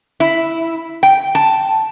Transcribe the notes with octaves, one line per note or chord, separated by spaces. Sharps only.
E4
G5
A5